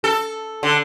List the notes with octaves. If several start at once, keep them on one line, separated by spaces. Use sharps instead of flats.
A4
D3